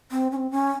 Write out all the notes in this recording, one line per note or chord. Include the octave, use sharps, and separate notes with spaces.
C4
C#4
C4
C#4